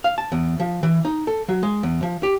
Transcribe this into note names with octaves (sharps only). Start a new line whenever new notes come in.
F5
A5
E2
F3
E3
D#4
A4
F#3
G#3
E2
F3
G4